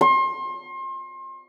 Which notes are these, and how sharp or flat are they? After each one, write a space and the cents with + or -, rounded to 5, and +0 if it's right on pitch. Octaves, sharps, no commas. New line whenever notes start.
C6 +35